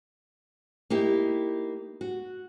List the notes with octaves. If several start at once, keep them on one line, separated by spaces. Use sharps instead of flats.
A#3 D#4 E4 G4
F#4